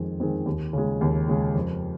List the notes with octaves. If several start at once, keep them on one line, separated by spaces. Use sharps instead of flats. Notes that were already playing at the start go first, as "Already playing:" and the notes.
Already playing: F2 D#3 G#3
D#3 G#3 C4
D#2
C#3 G#3
D#2
C#3 G#3
F2